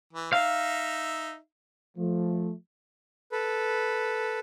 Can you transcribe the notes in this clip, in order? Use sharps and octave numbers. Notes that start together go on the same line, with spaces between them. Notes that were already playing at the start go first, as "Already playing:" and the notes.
E3
D#4 E5 F5
F3 A3
A4 B4